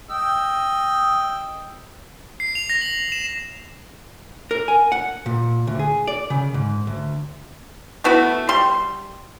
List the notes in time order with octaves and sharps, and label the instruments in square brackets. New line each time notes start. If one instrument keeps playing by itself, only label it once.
[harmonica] D#5 G5 E6
[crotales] C7
F7
A#6
F#7
E7
[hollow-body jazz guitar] A#4
G#5
F#5
A#2
D2
G#4
D5
C#3
G#2
D2
[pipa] A3 B3 E4 F#4
G3 C6